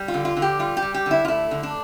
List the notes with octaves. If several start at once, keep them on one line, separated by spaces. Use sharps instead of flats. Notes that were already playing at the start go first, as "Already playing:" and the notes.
Already playing: G3
F4
D3
F4
D3
G4
G3 F4
G4
G3
G4
D3 E4
F4
A3 E4
D3
D4